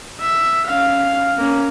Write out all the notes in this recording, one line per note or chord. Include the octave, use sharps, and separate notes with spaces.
E5
C#4 F5
A#3 C#4